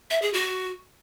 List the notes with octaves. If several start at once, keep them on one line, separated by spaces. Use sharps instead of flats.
E5
G#4
F#4